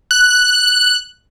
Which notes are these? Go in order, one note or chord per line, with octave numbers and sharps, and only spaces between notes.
F#6